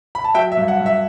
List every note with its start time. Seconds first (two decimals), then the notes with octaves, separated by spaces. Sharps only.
0.15 B5
0.24 A5
0.34 F#3 E5 G5
0.52 E5
0.57 G2
0.68 F#5
0.80 G2
0.86 E5